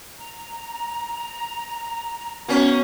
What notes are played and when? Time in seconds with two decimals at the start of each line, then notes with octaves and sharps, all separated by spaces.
0.17 A#5
2.49 A#3 B3 C#4 F#4 G#5